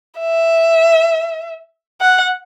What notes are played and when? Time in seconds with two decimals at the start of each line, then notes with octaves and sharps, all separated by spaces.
0.20 E5
2.01 F#5